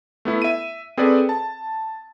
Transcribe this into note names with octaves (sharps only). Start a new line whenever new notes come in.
A3 B3 E4
E5 D#7
C4 G#4 A4 B4 D5
A5